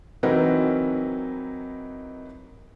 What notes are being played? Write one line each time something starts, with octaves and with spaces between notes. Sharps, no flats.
E3 F#3 C4 D#4 A#4 B4